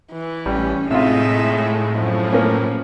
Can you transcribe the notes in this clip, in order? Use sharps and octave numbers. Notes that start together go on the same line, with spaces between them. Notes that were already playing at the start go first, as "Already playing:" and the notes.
E3
A1 G3 C#4
A2 C3 G#3 D#4 F4 E5
F#2 F3
A#3 C#4